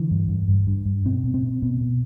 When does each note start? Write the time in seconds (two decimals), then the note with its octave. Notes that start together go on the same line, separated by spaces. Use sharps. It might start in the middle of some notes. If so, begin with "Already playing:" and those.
Already playing: D3 E3
0.11 G2
0.29 G2
0.48 G2
0.67 G2
0.85 G2
1.05 B2 C4
1.23 B2
1.34 C4
1.43 B2
1.62 B2 B3
1.81 B2